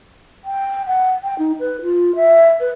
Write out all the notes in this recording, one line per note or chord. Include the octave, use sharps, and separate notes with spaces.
G5
F#5
G5
D#4
B4
F4
E5
B4